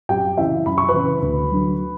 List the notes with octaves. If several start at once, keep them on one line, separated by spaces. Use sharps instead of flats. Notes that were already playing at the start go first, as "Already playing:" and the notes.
F#2 G4 G5
C#3 E3 E4 E5
F#2 B5
C#6
B4 B5
C#3 E3
D2
D3 F#3